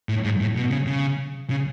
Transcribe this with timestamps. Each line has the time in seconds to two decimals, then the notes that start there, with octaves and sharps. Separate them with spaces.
0.09 A2
0.24 G#2
0.41 A2
0.56 B2
0.71 C#3
0.87 C#3
1.50 C#3